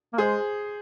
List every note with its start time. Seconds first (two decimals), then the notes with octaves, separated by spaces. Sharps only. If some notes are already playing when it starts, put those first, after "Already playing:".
0.13 A#3
0.18 G#3 G#4 C5